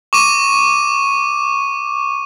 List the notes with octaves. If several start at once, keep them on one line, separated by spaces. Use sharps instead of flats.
C#6 D6 D#7